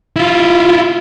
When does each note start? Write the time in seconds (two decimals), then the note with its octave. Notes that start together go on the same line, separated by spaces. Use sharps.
0.16 E4 F4